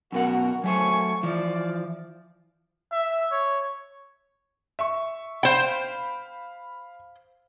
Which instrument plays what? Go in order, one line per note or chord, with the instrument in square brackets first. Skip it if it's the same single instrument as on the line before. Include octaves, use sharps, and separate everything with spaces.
[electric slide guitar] F#2 B2 F#5 [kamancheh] F#4 A#4
[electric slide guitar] F#3 A3 C5 [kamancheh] G#5 C#6
[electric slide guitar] E3 F3 [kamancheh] D5
[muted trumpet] E5
C#5
[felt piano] E5 C#6
[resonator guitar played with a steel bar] C5 G5 [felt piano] F5 B5